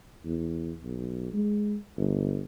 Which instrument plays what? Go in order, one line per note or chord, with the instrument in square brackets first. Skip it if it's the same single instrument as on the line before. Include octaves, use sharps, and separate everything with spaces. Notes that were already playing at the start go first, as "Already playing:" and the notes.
[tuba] E2
B1
G#3
G1